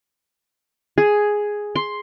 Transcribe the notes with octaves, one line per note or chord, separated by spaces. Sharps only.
G#4
C6